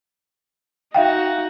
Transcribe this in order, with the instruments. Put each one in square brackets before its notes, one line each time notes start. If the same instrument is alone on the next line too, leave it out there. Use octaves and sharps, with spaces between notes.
[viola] D#4 F#4 [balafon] E5 F5 G5